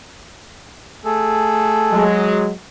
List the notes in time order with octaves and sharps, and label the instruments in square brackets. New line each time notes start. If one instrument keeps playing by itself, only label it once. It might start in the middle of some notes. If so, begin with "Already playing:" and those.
[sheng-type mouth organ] A3 G#4 A4
[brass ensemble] F#3 G#3